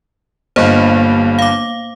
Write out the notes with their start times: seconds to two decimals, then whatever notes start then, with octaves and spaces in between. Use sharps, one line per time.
0.56 G1 G2 A#3 C5
1.39 F5 D6